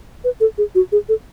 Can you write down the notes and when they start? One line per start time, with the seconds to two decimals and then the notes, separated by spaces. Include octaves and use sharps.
0.24 B4
0.41 A4
0.58 G#4
0.75 F#4
0.92 G#4
1.09 A4